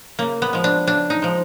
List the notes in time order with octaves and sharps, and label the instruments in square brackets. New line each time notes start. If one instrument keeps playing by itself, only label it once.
[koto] C#3 A#3
B3
F3 G#3
D4
C#3 D4
D#4
F3 G#3